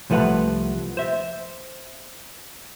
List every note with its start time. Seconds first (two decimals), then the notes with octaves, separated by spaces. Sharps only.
0.10 C2 F3 A3 B4 F#5
0.97 C5 E5